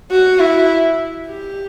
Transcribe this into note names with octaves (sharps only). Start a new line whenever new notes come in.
F#4
E4
G4